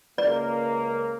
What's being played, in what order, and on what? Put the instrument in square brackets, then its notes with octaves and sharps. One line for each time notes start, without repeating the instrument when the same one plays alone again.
[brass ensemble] C#2 A#3 [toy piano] D5